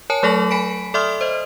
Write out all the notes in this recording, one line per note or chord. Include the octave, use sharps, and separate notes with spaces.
A#4 C#5 G#5 A5
F#3 A3 A4 C#6 A#6 F#7
G#5 B5 B6 D7
A4 D5 E5 C6 D#6 F6
C5 D#5